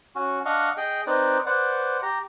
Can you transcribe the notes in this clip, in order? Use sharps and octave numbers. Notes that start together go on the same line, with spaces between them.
C#4 F#4
D4 D#5 F5 F#5 C#6
G#4 D#5 G5
C4 D#4 B4 C5 D5
B4 C5 D5 F#5
G4 A#5